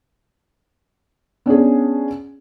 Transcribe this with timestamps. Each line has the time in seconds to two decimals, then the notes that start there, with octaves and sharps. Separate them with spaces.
1.46 B3 C#4 D4 G#4